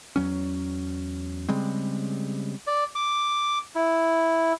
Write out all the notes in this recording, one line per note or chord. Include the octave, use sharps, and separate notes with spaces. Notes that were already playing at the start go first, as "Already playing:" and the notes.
E2 F#3 C#4
C#3 G3 G#3 C4
D5
D6
E4